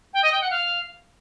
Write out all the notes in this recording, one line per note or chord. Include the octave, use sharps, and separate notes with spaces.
G5
D#5
G5
F#5
F5